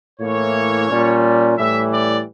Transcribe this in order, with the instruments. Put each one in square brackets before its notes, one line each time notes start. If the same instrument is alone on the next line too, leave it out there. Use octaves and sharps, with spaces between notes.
[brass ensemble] A2 E3 A#3 C#5
A#2 G3 C#4
A2 E3 G3 E5
D5